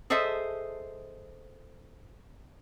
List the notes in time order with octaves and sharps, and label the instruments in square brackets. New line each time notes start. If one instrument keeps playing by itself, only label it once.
[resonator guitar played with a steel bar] G#4 A4 C5 D#5 E5